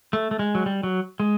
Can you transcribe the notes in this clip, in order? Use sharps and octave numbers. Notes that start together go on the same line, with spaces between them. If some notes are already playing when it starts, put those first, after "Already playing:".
A3
A3
G#3
F#3
G3
F#3
G#3